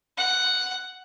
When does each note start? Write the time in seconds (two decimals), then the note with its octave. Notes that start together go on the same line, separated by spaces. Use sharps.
0.17 F#5